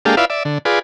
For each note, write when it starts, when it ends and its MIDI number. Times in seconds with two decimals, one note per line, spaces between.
0.05 0.15 56
0.05 0.15 58
0.05 0.15 62
0.05 0.15 67
0.05 0.15 69
0.05 0.15 77
0.17 0.25 64
0.17 0.25 65
0.17 0.25 71
0.17 0.25 74
0.17 0.25 76
0.17 0.25 77
0.30 0.43 74
0.30 0.43 76
0.45 0.58 50
0.65 0.79 65
0.65 0.79 68
0.65 0.79 71
0.65 0.79 74